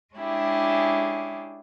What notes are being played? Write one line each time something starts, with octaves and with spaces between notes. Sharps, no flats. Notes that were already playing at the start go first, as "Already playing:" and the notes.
G#3 C#4 D4 E4 G4 G#4